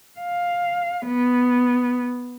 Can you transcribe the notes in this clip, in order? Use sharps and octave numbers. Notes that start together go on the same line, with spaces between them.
F5
B3